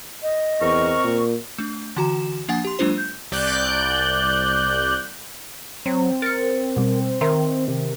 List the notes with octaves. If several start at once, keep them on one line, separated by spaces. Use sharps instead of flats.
D#5
E2 C4 A#4 C#6
A#2
A3 D4
D3 E3 F#4 A#5 E7
F3 A#3 D4 F#5 G#5 A6
G4 C6
F#3 G#3 A#3 D4 F4 C5
G6
C2 D5 F#6 G6
F#3 C4
A#4 A6 C#7
B2 G3
D#3 C4 A#4 E5 C6
C3